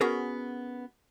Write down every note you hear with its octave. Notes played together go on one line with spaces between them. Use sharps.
B3 C#4 F#4 G#4 A#4